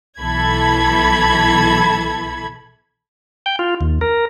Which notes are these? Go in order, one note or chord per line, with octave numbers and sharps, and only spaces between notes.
B1 E3 A4 B5 G#6
G5
F4
D#2
A#4